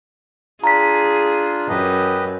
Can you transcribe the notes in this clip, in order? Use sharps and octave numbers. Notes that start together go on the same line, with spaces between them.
D4 F4 G#4 A#5 B6
F#2 G4 B4 D#5